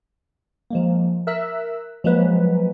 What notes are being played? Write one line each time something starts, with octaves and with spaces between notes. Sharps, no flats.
F3 G#3 A#3
A#4 E5 E6 F#6
F3 F#3 G#3 A#3 B4